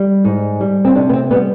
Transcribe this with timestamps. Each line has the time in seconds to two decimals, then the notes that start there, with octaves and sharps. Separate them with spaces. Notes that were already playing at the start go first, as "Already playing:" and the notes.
Already playing: G3
0.24 G#2
0.61 G3
0.85 C4
0.95 C3 D4
1.09 B3
1.13 C4
1.31 G3 B3